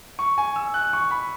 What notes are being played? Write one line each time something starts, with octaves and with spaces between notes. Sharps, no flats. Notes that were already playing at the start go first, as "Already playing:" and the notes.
C#6
G#5
E6
F#6
C#6
B5